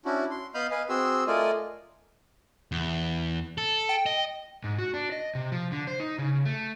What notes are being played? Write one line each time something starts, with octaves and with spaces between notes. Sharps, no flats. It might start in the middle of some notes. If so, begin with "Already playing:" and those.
C#4 D4 E4 F#4
C6
B3 D#5 F5 B5 F6 G6
B4 D#5 F5 G#5
C4 F#4 G#4 C6 E6
A3 F4 A#4 D5 D#5 G#5
E2
A4
G5
D#5
G#2
F#4
D4
D#5
C3
F3
D3
C5
D#4
C#3
A3